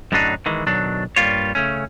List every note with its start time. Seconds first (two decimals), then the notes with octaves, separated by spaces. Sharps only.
0.12 F#2 A2 D3 F#3 D4 D#4
0.46 D#3 E3 G#3
0.67 B1 D#3 F#3 D4
1.16 G2 G3 A#3 F4 C#5
1.55 C#3 A3 C#4